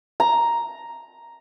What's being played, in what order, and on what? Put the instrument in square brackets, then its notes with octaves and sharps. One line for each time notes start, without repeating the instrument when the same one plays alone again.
[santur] A#5